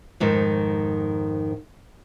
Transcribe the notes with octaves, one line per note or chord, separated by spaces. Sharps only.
F2 G#2 D#3